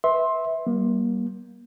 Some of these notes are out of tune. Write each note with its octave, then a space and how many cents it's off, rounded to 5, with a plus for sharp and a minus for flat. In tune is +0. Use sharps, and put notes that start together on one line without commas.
B4 +5 E5 -20 C6 +15
G3 -25 A#3 +30